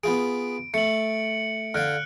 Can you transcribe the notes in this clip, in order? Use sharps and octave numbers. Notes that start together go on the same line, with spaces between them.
B3 F4 G#4 D7
A3 C#7 F#7
D3 F5 F6 F#6 D7